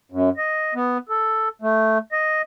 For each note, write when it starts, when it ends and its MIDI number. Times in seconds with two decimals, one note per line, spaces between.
0.12 0.29 42
0.37 0.74 75
0.75 0.98 59
1.09 1.49 69
1.62 1.98 57
2.12 2.42 75